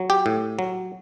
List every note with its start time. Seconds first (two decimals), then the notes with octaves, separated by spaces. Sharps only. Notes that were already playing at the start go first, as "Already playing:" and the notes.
Already playing: F#3
0.10 G4
0.26 A2
0.59 F#3